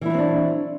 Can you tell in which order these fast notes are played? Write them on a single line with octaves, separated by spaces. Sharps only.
E3 E4 F#3 C4 D4